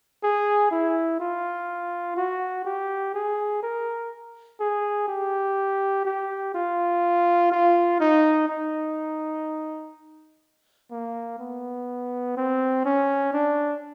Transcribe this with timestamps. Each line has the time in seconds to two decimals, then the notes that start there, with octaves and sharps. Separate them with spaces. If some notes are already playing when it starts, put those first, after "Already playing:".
0.24 G#4
0.71 E4
1.20 F4
2.17 F#4
2.65 G4
3.14 G#4
3.63 A#4
4.60 G#4
5.08 G4
6.05 G4
6.55 F4
7.52 F4
8.00 D#4
8.48 D#4
10.91 A#3
11.39 B3
12.37 C4
12.85 C#4
13.33 D4